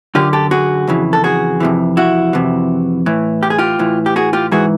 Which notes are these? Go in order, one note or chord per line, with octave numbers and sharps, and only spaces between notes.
F#2 D3 F4 G4
G4 A4
F#4 G#4
F2 C#3 E3
A4
F#4 G#4
F2 C3 E3
E4 F#4
F2 C3 E3
A2 E3
G4
G#4
F4 G4
A2 E3
G4
F#4 G#4
F4 G4
G#2 E3 F#4 G#4